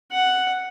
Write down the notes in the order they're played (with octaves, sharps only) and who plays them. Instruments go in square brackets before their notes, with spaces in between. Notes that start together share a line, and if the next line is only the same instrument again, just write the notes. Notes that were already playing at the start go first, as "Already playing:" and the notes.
[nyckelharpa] F#5